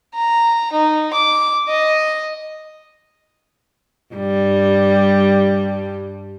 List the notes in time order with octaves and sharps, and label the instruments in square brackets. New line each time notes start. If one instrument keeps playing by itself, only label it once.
[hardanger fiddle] A#5
D#4
D6
D#5
[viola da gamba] G2 G3